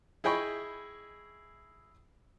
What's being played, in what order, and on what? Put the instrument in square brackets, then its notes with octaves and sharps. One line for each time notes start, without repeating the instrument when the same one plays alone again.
[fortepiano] E4 G#4 D#5 G5 B5 C#6